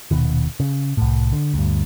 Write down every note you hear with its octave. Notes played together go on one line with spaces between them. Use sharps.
D#1 B2 D#3
C#3
C2 A2
D3
D2 G2